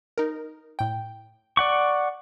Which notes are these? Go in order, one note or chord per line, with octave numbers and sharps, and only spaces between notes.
D#4 A#4
A2 G5
D5 F#5 C#6